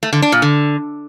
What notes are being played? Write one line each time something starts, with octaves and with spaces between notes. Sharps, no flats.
A3
D3
D4
A#2
D3